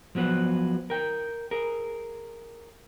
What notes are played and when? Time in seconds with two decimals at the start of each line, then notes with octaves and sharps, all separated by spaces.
0.15 F3 F#3 B3 B4 C5
0.90 A#4 G5
1.51 G#4 A#4